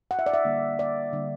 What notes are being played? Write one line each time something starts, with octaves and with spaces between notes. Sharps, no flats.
F#5
E5
D5
E5
D3 G3 A#3
D5
D3 G3 A#3